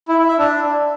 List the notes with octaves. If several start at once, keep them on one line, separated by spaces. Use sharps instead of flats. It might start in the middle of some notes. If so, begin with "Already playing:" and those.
E4
E4
E5
D4